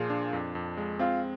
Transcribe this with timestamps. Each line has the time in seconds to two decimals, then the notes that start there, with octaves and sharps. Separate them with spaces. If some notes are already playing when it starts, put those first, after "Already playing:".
Already playing: A#2 F3 F4 G#4
0.10 D4
0.33 F2
0.55 F2
0.77 G#3
0.99 C4 F4